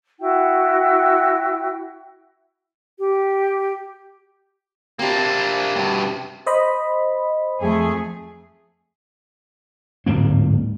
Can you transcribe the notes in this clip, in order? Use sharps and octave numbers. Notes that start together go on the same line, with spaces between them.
E4 F#4 G5
G4
C3 A#3 C4 D4
G2 B2
C5 D#5 B5
F2 A3 G#4
D1 G#2 A#3 C4